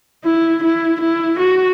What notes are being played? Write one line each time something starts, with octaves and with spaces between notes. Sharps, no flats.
E4
E4
E4
F#4